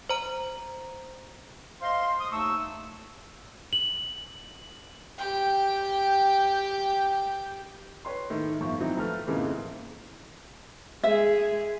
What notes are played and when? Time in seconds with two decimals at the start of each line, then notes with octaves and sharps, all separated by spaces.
0.09 C5 A#5
1.81 C5 D#5 F5 C6
2.20 D#6
2.32 D#2 A3 D#4 A5 C#6 E6
3.73 F#7
5.18 G4 G5
8.05 B4 C#5 C6
8.30 A2 D#3
8.60 G1 F3 C#6
8.80 E3 F#3 C4 D#4
8.97 F3 A3 B4 A5 F6
9.27 F2 G#2 C#3 E3 A#3 C4
11.03 G#3 G#4 E5